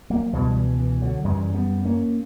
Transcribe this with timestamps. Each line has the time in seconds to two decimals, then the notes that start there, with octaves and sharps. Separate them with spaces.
0.10 F#3 A#3
0.33 C#2 B2 E3 G3
0.56 E3
0.79 E3
1.01 D3 F#3
1.24 F#2 C#3 E3 G3
1.54 G3 B3
1.85 A#3 C#4